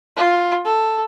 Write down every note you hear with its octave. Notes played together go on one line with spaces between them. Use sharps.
F4
A4